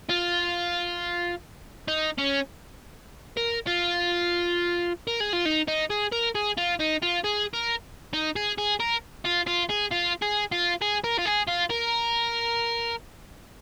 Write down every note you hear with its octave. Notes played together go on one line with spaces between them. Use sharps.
F4
D#4
C#4
A#4
F4
A#4
G#4
F4
D#4
D#4
G#4
A#4
G#4
F4
D#4
F4
G#4
A#4
D#4
G#4
G#4
A#4
F4
F4
G#4
F4
G#4
F4
G#4
A#4
F4
G#4
F4
A#4